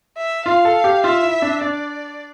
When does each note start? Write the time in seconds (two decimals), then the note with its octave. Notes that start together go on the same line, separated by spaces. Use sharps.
0.17 E5
0.45 F4 F5
0.65 A4
0.84 G4
1.04 F4 E5
1.23 E4
1.42 D4
1.61 D4 D5